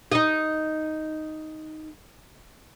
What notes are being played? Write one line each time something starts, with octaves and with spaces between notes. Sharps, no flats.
D#4 D#5